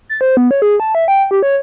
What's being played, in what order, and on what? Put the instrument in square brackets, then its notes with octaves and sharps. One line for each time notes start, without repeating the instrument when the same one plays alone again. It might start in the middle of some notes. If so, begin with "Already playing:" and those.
[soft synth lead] A6
C5
B3
C#5
G#4
A5
E5
G5
G4
C#5